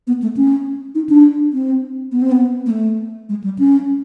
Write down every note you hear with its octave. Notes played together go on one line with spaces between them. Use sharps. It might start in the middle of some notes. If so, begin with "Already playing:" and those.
B3
A3
C#4
D#4
D4
C4
B3
C4
B3
A#3
A3
G#3
G3
C#4